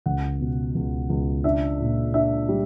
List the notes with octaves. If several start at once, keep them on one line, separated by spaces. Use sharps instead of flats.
C#2 F#5
B2
C#2
C#2
D4 E5
A#2
D4 E5
G3